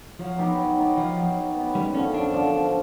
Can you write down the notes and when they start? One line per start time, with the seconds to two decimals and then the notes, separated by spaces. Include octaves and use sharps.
0.19 F3 F#3
0.39 B3 D#4 G4
0.59 F#3
0.78 B3 D#4 G4
0.97 F3 F#3
1.16 B3 D#4 G4
1.36 F#3
1.56 B3 D#4 G4
1.75 F#2 G3
1.94 D3 C#4
1.98 F3
2.13 F#2 D4
2.33 D3 F3
2.53 F#2